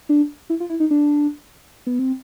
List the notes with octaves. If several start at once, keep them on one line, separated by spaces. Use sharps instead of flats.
D4
E4
F4
E4
D#4
D4
B3
C4